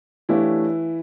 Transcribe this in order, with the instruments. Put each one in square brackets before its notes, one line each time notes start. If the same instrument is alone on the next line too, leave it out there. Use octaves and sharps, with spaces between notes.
[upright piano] E3 E4 [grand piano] A3 D4 G4 C#5 F5